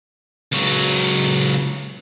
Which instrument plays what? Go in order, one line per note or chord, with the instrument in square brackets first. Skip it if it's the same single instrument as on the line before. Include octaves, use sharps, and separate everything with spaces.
[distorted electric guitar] C#2 F#3